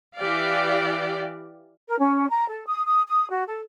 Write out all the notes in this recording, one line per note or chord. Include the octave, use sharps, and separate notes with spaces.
E3 G4 D5 F5
A#4
C#4
A#5
A4
D#6
D#6
D#6
F#4
A4